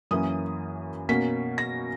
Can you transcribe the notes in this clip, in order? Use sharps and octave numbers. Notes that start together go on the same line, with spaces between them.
F#2 E3 A#3 C#4 D#6
B2 A#3 C#4 B6
A#6